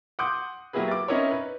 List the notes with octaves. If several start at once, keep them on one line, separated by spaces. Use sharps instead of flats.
F#5 C6 D6 D#6 G6
F#3 A#3 E4 G4 G#4 B4
D6 A6
C4 C#4 D#4 E4 A#4 C#5
B4